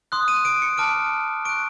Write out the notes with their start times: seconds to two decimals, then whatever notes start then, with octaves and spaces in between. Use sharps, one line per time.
0.12 C6 D#6 F#6
0.28 D#7
0.45 D7
0.62 C#7
0.77 A5 D6 F6 D7
1.45 C#6 F#6 D7